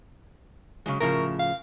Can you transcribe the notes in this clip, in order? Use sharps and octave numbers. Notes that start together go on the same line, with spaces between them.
C#3 F#3 G#3
A2 C#3 F3 A#4
F5